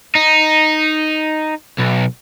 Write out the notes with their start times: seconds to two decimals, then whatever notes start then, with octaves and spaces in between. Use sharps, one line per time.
0.15 D#4
1.78 B1